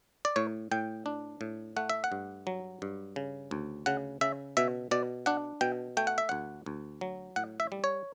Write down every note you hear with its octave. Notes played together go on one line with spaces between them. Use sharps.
D5
A2 C#5
A2 G5
D4
A2
A3 F#5
E5
F#5
G2
F#3
G2
C#3
D2
C#3 F#5
C#3 E5
B2 E5
B2 D5
D4 F#5
B2 G5
A3 G5
F#5
E5
D2 F#5
D2
F#3
A2 F#5
E5
G3
C#5